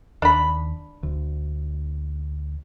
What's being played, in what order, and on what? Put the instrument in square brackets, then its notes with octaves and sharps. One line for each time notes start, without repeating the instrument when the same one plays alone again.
[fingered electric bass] D#2 [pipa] D4 B5
[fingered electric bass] D2